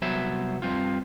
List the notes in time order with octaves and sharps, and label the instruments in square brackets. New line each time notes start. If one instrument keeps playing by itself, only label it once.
[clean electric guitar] C2 F#3 B3 C5 C#5 E5
G2 C4 F4